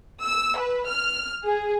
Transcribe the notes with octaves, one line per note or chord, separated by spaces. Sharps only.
E6
B4
F6
G#4